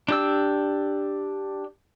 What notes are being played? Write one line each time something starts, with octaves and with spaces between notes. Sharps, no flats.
D4 G4 E6